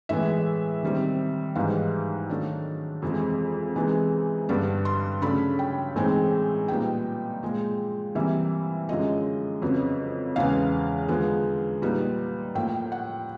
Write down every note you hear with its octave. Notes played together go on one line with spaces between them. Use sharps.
A2 E3 G#3 B3 E5
C3 D#3 G3 C4
G#2 E3 G3 B3 D#4 F5
D#3 F#3 A3 D4
F2 C3 E3 G#3
C3 E3 G#3 B3 D#4
G2 D3 G3 B3 D4
C6
C#3 F#3 A3 D4 B5
G5
A2 E3 G#3 C4 D#4
A#2 G3 B3 D#4 G5
A#2 F3 G#3
C3 E3 G3 A#3 E5
F#2 D3 F3 G#3 D#5
F2 C#3 F#3 B3
E2 C#3 E3 G#3 B3 F5
D3 F3 G#3 B3
A#2 G3 B3 D#4
A2 F3 A#3 G5
F#5